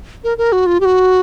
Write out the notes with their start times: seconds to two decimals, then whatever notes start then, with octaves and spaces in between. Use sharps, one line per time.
0.24 A#4
0.38 A#4
0.52 F#4
0.66 F4
0.80 G4
0.85 F#4